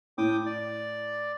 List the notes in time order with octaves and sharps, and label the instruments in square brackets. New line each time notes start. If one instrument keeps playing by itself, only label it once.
[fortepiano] A2 [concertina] G5 D6 D#6
[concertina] D5